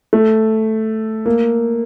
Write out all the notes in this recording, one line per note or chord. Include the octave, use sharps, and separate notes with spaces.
A3
A#3